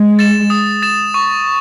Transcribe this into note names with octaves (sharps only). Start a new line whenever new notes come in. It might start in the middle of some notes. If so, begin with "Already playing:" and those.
Already playing: G#3
A6 E7
D#6
A6 E7
C#6